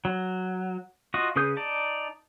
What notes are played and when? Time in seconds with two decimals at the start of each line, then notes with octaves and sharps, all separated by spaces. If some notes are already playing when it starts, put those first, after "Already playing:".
0.05 F#3
1.14 F4 F#4 D#5
1.36 C#3 G#4 B4 D#6 G6
1.57 D#4 D5 A5